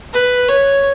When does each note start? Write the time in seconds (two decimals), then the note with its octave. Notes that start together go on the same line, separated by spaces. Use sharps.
0.14 B4
0.49 C#5